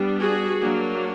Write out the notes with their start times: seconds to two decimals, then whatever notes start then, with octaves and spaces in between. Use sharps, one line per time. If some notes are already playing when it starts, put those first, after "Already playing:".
Already playing: G3 B3 D4
0.19 F#4 G#4
0.61 F#3 A#3 D4